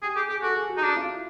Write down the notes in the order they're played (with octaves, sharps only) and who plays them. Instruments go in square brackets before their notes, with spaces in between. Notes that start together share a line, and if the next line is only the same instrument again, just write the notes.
[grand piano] G4 [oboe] G#4
[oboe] G4 [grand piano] G#4
[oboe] G4 [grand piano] G#4
[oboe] F#4 [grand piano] A4
[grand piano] G#4
F#4
[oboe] D#4
[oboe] D4 [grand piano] F#4
[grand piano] F4
E4